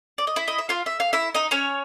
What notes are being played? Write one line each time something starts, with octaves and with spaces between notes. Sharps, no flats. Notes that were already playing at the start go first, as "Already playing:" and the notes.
D5
D#5
E4 E5
D#5
E5
F4 F5
E5
F5
E4 E5
D#4 D#5
C#4 C#5